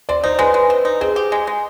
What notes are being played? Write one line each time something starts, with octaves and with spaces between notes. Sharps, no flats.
C4 D5
D#4 C5
G#3 B4
G#3
C4
D#4
C4 G#4
G4
G#3
G#3